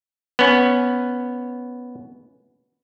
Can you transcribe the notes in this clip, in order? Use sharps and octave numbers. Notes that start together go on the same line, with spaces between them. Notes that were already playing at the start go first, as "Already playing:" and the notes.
B3 C#4